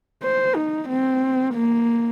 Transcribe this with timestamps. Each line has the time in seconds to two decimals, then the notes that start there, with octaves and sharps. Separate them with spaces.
0.23 C5
0.56 D#4
0.89 C4
1.55 A#3